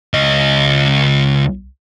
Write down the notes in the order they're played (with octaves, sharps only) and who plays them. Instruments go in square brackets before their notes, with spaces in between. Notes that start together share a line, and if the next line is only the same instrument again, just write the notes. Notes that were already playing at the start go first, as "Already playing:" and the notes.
[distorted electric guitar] C#2 D#5